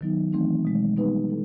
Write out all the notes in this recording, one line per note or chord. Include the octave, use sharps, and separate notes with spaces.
D#3 F#3 B3 D#4
E3 A3 C4 D#4
B2 G#3 C4
G3 B3 D#4 G4 B4
B3 E4 A4